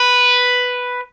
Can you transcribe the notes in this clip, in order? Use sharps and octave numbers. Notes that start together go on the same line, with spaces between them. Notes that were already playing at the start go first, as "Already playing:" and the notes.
Already playing: B4